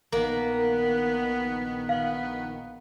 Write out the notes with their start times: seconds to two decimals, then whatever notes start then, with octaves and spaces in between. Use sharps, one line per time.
0.12 A#1 D#3 A#3 B3
1.89 B3 F5